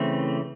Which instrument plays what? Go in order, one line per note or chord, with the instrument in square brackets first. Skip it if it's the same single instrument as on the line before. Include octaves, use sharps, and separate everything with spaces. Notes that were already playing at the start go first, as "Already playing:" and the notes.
Already playing: [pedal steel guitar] C#3 E3 A3 C4